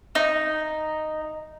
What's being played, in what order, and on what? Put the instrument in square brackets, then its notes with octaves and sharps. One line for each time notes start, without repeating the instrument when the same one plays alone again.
[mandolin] D#4